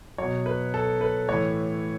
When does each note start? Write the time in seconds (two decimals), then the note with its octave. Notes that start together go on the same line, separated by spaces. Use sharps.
0.18 B2 F#3 C#5
0.46 B4
0.74 A4
1.01 B4
1.28 A2 E3 C#5